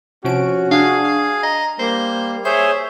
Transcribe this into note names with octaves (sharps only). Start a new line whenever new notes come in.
C3 F3 C#4 F#4 D7
D4 G#4 F5
F5
D#5 A#5
G3 A#3 C5
G#4 C5 C#5 E5 G6